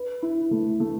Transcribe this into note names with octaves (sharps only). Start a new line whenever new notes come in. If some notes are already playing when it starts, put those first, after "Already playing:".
Already playing: B4
E4
A3
A3